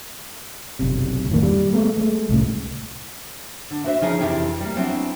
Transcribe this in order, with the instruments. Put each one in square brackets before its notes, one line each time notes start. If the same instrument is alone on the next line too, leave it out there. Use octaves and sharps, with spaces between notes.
[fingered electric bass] F#1 B1 C3
F2 A2 D#3 A#3
G3
G#3 A3 B3
G#3 A3
C2 A2 C#3
[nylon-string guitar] D3
E4 F#4 B4 C5 E5
C#3 F3 C#4 D#4 E4 G#4
F2 C3 E3 E4 G4 G5
G3 A#3
F#3 B3 C4 D4 E4